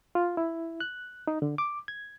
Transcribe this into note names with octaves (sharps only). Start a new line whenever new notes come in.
F4
E4
F#6
D#4
D3
D6
G#6